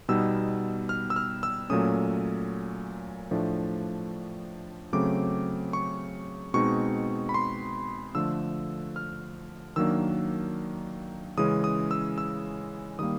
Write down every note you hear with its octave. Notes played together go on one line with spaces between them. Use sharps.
B2 G3 B3 D#4 E6
F6
E6
F6
E6
A#2 F#3 A3 C#4 D#6
A2 F3 A3 D4
C#3 F#3 A3 C4 D6
C#6
B2 G#3 C4 D#4 C#6
B5
C6
D3 F3 A3 E6
F6
D#3 F#3 A#3 D4 E6
C#3 E3 G#3 C#4 D#6
D#6
E6
E6
D#3 G3 A#3 D#6